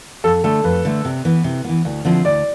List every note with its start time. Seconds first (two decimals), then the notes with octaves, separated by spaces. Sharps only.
0.24 F2 A4
0.44 D3 A3 A4
0.64 F2 B4
0.85 D3 A3
1.05 C3
1.25 E3 B3
1.44 C3
1.64 E3 B3
1.85 D2
2.05 D3 F3 C4 E4
2.25 D2 D5